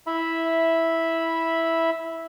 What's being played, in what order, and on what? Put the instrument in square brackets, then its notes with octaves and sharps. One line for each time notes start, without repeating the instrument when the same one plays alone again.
[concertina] E4 E5 B5